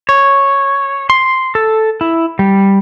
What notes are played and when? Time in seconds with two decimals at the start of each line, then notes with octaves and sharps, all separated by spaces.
0.09 C#5
1.10 C6
1.55 A4
2.01 E4
2.39 G3